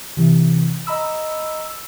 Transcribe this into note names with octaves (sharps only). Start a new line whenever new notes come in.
C3 E3
D#5 A#5 B5 E6
E6